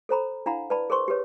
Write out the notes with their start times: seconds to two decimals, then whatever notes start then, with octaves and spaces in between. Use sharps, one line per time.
0.09 A4 C5 A#5 B5
0.46 D4 E4 F5 F#5 A#5 B5
0.70 B4 D5 A5 B5
0.90 G#4 A#4 C5 C6 C#6
1.08 G4 G#4 B4 C#5